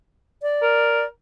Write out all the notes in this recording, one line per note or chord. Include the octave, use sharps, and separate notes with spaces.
D5
A#4